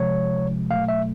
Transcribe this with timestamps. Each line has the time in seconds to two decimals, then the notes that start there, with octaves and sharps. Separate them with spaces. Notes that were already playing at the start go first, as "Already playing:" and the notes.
Already playing: C3 F3 G#3 C#5
0.70 B2 F#3 A3 F5
0.88 E5